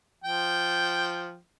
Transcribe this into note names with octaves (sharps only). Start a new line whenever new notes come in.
F3 G5